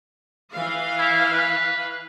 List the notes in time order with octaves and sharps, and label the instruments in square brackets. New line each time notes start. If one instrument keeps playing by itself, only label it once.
[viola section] E3 F5
[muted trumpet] E4
B4